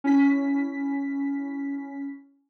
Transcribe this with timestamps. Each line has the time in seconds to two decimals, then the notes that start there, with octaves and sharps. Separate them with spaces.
0.04 C#4 E4 B6